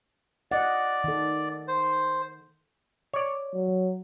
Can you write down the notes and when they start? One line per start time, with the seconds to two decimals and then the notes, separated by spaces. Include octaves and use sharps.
0.51 D5 D#5 F#5
1.04 D#3 A4
1.68 C5
3.13 C#5 D5
3.54 F#3